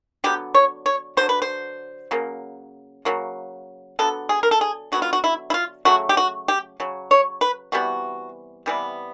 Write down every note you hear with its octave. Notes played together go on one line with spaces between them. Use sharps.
D3 F#3 B3 G4
C#5
C#5
D3 F#3 B3 C5
B4
C5
C#3 F#3 A#3
C#3 F#3 A#3
D3 F#3 B3 A4
G#4
A#4
A4
G#4
D3 F#3 B3 F#4
F4
F#4
E4
E4
F4
C#3 F#3 A3 F#4
G4
F#4
G4
C#3 F#3
C#5
B4
C3 E3 G3 B3 F#4
C3 E3 G3 B3